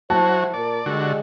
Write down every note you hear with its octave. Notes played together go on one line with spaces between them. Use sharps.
F#3 E4 F#4 C5 A5
A#2 A#4 D5
D3 G3 G#3 F#4